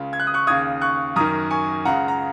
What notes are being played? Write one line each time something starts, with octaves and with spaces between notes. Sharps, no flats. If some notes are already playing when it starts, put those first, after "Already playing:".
Already playing: C#2 C#3
G#6
F#6
D#6
C#6 F#6
D#2 C#3 D#6 G#6
C#6 F#6
F#2 D#3 A#5 D#6
G#5 C#6
C#2 C#3 F#5 A#5
A#5